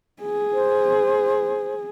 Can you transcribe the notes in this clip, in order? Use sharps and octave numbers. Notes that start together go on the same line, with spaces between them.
G#4
C5